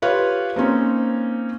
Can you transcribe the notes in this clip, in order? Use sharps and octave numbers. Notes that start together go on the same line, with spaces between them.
F4 G4 B4 C#5 F5
A#3 C4 C#4 D#4